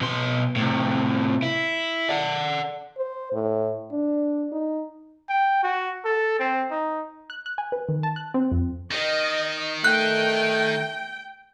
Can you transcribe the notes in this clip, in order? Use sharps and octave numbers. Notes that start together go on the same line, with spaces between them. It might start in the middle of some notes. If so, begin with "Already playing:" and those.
B2 C6
A2 C3
E4
D5 F#5
C5
A2
D4
D#4
G5
F#4
A4
C4
D#4
F#6
F#6
G#5
B4
D#3
A5
F#6
C4
F2
D#3 D#5
A3 G5 F#6